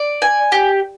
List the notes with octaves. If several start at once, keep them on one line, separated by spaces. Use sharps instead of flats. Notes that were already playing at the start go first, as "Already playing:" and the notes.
Already playing: D5
G#5
G4